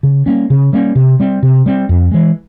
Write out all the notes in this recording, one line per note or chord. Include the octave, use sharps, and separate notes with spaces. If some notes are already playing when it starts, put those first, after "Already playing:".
C#3
G3 A#3 C#4
C#3
G3 A#3 C#4
C3
G3 C4
C3
G3 C4
F2
E3 G#3